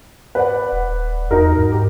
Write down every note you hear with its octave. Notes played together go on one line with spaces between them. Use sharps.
B4 D5 F#5
D#1
E2 D#4 F#4 A#4
G#2
G4